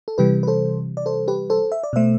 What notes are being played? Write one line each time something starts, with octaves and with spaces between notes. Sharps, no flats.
A4
C3 E3 G3 G4 B4
B4
A4 C5
D5
A4 C5
G4 B4
A4 C5
E5
D5
B2 A3 C5 E5